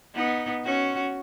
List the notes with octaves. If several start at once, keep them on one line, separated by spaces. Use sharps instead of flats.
B3 D#4
C#4 F#4